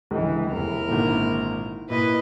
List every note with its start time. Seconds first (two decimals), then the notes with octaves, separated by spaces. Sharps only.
0.11 C#2 D3 E3
0.50 F1 E2 E4 A#4
0.88 G#1 A#2 D3
1.90 A#2 E4 B4 D#5